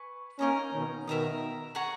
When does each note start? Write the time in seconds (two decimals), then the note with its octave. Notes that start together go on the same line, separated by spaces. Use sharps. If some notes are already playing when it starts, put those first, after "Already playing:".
Already playing: B4 G#5 C#6
0.39 A#3 C#4 D#4 A#4 D#5 A#5
0.73 B2 D#3
1.07 B2 D#3 A#4 E5 A#5 D#6
1.75 G#4 C#5 F#5 A#5